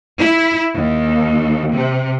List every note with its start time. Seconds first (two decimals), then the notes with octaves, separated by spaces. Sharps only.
0.20 E4
0.75 D#2
1.75 C3